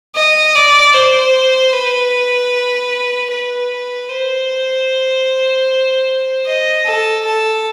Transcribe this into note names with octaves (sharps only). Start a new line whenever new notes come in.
D#5
D5
C5
B4
B4
C5
D#5
A4
A4